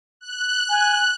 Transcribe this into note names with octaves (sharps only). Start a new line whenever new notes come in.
F#6
G#5